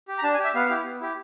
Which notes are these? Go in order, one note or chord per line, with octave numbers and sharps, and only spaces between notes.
G4
A#5
D4 A5
G#5
G4
E5
B3 F5
E4 G4
B3
E4 G4